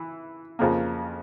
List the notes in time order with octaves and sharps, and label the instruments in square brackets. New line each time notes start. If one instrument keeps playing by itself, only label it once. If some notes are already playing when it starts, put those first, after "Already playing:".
Already playing: [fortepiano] E3
F2 C#3 F3 A#3